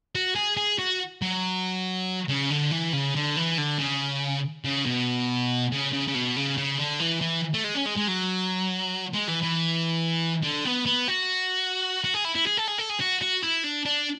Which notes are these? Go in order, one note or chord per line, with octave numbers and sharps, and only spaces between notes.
F#4
G#4
G#4
F#4
F#3
C#3
D3
E3
C#3
D3
E3
D3
C#3
C#3
B2
C#3
C#3
C#3
B2
C#3
C#3
D3
E3
E3
A3
G#3
C#4
G#3
G#3
F#3
G#3
E3
E3
D3
B3
B3
F#4
F#4
G#4
E4
E4
G#4
A4
G#4
A4
G#4
F#4
F#4
E4
D4
D4